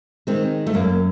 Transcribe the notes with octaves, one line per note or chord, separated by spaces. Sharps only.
D#3 G#3 C4
A3
F#2 A#3